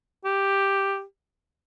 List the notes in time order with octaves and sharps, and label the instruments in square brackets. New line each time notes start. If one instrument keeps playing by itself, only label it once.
[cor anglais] G4